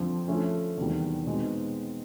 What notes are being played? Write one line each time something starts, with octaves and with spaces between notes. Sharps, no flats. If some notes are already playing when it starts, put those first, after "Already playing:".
Already playing: F2 D3 F3
D3 F3 A3 C#4
E2 C3 D#3 G3
B2 G#3 C4 D#4